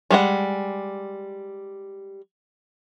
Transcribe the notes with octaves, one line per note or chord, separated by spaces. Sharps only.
G3 G#3 F#5